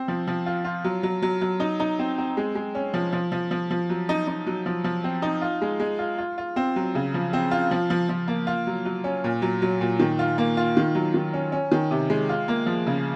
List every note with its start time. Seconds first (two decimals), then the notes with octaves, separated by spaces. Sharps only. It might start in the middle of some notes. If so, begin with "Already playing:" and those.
Already playing: C4
0.08 F3
0.27 F3
0.46 F4
0.64 F4
0.84 F#3
1.03 F#3
1.22 F#3
1.41 F#3
1.60 D#4
1.80 D#4
1.99 C4
2.18 C4
2.37 G#3
2.55 G#3
2.75 C#4
2.94 F3
3.12 F3
3.32 F3
3.51 F3
3.71 F3
3.90 F#3
4.09 D#4
4.28 D#4
4.47 F#3
4.66 F3
4.84 F3
5.04 C4
5.22 D#4
5.42 F4
5.61 G#3
5.80 G#3
5.99 F4
6.18 F4
6.38 F4
6.56 C4
6.76 F#3
6.95 C#3
7.14 F3
7.33 C4
7.51 F4
7.71 F3
7.90 F3
8.09 F3
8.28 A#3
8.47 F4
8.67 F#3
8.85 F#3
9.04 C#4
9.24 A#2
9.42 F#3
9.62 F#3
9.81 A#2
10.00 D#3
10.19 F4
10.38 A#3
10.57 F4
10.77 D#3
10.95 F#3
11.14 D#3
11.34 C#4
11.52 C#4
11.72 D#3
11.91 C3
12.10 G#3
12.29 F4
12.48 A#3
12.66 F3
12.87 C#3